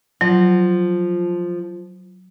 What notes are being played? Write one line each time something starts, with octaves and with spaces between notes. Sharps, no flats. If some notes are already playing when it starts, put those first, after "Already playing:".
F3 F#3